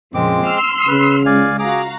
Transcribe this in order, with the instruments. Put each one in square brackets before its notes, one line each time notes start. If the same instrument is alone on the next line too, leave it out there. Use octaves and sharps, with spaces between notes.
[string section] F2 A#2 C#3 [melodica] G#3 C4 D6
[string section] C6 E6 F6
[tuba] C#3 [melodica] B4
[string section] C#2 G#3 [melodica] D5 F5 G#5
[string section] F#4 F5 A#5 [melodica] G#4 D6